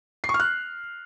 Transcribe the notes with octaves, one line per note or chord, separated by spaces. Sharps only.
C7
C#6
F6
F#6